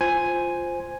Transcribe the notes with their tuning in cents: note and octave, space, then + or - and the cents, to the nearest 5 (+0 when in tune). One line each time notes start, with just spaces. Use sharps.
F4 +0 C5 +0 G#5 +0